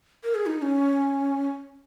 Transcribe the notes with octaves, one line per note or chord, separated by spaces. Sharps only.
A#4
G#4
D#4
D#4
C#4